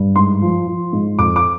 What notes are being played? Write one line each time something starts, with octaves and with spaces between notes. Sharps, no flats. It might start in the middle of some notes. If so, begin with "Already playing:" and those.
Already playing: G2
G#2 C6
F3
F3
G#2
F2 D6
D6